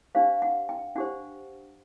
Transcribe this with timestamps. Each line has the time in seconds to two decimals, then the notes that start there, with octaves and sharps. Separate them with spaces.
0.15 D4 G4 C5 F5
0.42 F#5
0.69 G5
0.96 D4 G4 C5 F#5